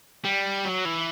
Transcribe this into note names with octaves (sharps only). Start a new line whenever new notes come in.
G3
F#3
E3